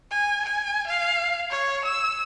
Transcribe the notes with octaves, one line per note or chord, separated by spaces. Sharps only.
G#5
G#5
F5
C#5
E6